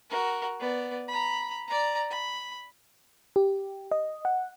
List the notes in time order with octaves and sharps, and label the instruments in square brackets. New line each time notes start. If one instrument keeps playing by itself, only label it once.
[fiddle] F#4 A#4
B3 D5
A#5 B5
D5 A#5
B5
[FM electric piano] G4
D#5
F#5